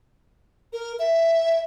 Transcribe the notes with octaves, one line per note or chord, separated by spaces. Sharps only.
A#4
E5